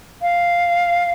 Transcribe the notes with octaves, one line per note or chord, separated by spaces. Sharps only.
F5